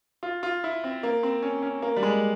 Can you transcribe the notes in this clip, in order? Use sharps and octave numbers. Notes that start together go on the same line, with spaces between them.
F4
F4
E4
C4
A#3
C4
C#4
C#4
A#3
G3
G#3